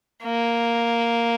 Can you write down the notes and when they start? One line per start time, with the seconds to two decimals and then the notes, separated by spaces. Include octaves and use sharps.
0.24 A#3